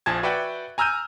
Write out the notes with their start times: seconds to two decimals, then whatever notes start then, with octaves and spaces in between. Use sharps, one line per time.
0.06 A#1 F3 G#5 A5 G#6
0.23 F#4 B4 D5 E5 F#5 G5
0.78 G#5 A#5 E6 F6 G6 D#7